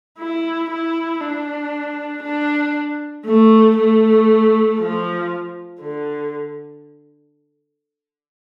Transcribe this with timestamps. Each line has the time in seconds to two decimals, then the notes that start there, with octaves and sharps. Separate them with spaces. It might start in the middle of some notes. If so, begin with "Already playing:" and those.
0.19 E4
0.70 E4
1.21 D4
2.23 D4
3.26 A3
3.77 A3
4.78 F3
5.81 D3